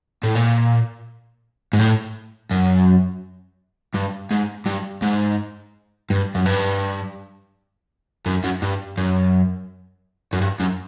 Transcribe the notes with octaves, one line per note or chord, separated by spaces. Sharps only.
A2
A#2
G#2
A2
F#2
G2
G#2
G2
G#2
G2
F#2
G2
F#2
F#2
G2
F#2
F#2
G2
F#2